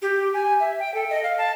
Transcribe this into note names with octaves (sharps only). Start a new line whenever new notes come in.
G4
G#5
E5
G5
A4
D#5
F5
A5